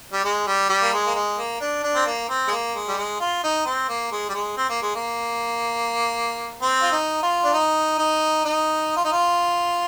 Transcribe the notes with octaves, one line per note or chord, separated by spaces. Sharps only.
G3
G#3
G3
G3
A#3
G#3
A#3
G#3
A#3
D4
D4
C4
A#3
C4
G#3
A#3
G#3
G3
G#3
F4
D#4
C4
A#3
G#3
G3
G#3
C4
A#3
G#3
A#3
C4
F4
D#4
F4
D4
D#4
D#4
D#4
F4
D#4
F4